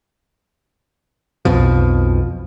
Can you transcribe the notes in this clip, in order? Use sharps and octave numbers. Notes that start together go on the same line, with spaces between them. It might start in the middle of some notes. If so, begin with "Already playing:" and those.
B1 F2 B2 F3